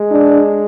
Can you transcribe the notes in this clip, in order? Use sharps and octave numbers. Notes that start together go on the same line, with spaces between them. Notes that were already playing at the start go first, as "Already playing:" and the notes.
Already playing: G#3
D4